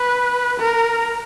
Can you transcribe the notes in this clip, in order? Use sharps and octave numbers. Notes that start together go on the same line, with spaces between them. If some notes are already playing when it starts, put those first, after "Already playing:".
Already playing: B4
A#4